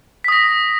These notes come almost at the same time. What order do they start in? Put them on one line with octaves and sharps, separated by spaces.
B6 D#6 A#6